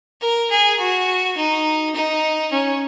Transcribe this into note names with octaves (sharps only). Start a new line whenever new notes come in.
A#4
G#4
F#4
D#4
D#4
C#4